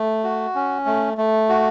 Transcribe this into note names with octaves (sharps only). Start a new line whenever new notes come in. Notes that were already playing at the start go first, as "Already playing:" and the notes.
Already playing: A3
F#4
C#4
A3
A3
F#4